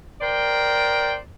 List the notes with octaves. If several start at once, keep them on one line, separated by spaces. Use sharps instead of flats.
A#4 C5 D5 G5